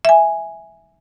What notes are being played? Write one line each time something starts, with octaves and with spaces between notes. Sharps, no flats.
E5 G#5